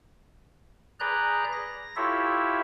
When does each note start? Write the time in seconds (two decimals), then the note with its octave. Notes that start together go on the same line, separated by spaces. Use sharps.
1.00 G#4 B4 D5 A#5 F#6 G6
1.53 A#6
1.96 E4 F4 G4 A4 C#5 E5